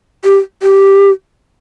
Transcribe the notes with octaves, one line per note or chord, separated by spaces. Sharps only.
G4
G4